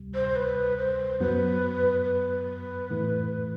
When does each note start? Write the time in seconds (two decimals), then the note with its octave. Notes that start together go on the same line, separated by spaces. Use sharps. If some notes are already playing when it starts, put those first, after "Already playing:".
Already playing: D2 C3 G3
0.15 C5
0.36 B4
0.78 C5
1.20 F#2 F#3 B3 B4
2.05 B4
2.90 A2 E3 A3 E4